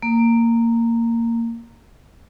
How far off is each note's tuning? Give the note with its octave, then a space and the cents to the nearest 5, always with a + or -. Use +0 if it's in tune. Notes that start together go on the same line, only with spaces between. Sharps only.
A#3 -15